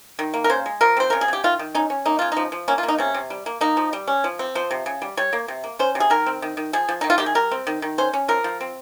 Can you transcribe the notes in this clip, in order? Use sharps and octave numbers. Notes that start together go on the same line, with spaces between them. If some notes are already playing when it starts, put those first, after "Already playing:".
D#3
A#3
A#4
C#3 C5
G#3
F3 A#4
C4 C5
C#3 A#4
G#4
C#3 G4
D#3 F4
D#3
C#4 D#4
C#4
A#3 D#4
C#3 F4
F3 D#4
F3
A#3 C#4
F4
A#3
D#4
C3 C#4
C3
G3
A#3
A#3 D#4
F3
G3
C#4
F3
C4
F3 C5
C3
C#3
G3
G3 C#5
A#3
C3
A#3
C#4 C5
C3
G#4
D#3 A#4
C4
D#3
D#3
F3 G#4
F3
D#3 D#4
F4
D#3 G4
G#4
G3 A#4
C4
D#3
D#3
C#4 C5
C#4
F3 A#4
F3
C4